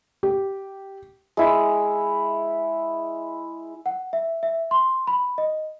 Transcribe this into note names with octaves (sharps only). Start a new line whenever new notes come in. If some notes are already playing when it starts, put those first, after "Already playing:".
G4
G#3 E4
F#5
E5
E5
C6
B5
D#5